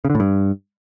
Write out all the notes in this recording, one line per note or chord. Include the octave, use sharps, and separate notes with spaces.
C#3
D3
A2
G2